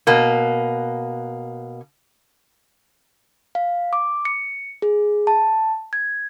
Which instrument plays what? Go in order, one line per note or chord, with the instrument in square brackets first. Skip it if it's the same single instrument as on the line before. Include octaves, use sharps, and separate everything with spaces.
[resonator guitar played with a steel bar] B2 A#3
[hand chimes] F5
D6
C#7
G#4
A5
G#6